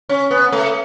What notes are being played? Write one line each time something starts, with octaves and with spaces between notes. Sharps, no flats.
C#4
B3
A3